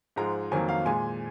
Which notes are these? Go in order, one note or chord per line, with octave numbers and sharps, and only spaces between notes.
G#2 F3 G#3 A#5
F2 D#3 F#3 A#3 G#5
F5
A#2 G#3 G#5